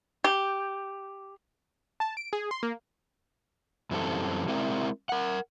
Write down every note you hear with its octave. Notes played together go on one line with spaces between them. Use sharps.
G4
A5
D7
G#4
C6
A#3
F#2 E3 G3 C4 A4
G#3 C4 E4 A#4 D5 E5
A#4 F#5